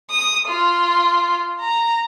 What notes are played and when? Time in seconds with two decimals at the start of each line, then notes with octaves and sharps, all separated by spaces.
0.11 D#6
0.48 F4
1.61 A#5